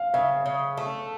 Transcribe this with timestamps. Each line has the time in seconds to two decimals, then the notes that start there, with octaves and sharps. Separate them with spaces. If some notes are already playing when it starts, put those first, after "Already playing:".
Already playing: F5
0.14 C#3 E5
0.46 C#3
0.77 A3